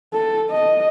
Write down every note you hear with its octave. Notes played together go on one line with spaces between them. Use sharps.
A4
D#5